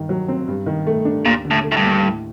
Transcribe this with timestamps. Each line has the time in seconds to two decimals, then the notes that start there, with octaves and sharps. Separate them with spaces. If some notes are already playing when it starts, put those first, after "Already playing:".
Already playing: G2 D#3
0.09 F#3
0.28 C4
0.48 G2
0.66 D#3
0.87 A3
1.05 D4
1.25 D#2 A#2
1.45 D3
1.51 A2
1.63 A3
1.72 A2
1.77 G2
1.83 D#2
2.02 A2